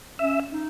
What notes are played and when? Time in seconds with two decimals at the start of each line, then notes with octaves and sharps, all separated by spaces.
0.19 C#4 E5
0.52 D#4